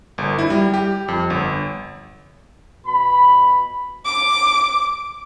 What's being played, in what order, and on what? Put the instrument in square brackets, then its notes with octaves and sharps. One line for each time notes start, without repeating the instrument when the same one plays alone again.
[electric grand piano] G1
E4
G3
G4
F2
G1
[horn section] B2 B5
[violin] D6